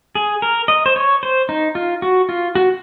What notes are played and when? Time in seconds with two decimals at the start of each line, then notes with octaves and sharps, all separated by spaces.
0.15 G#4
0.42 A#4
0.68 D#5
0.86 C5
0.96 C#5
1.23 C5
1.49 D#4
1.75 F4
2.02 F#4
2.29 F4
2.55 F#4